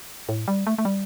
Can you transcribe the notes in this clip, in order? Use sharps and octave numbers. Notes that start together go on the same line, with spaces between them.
A2
G3
A3
A3
G3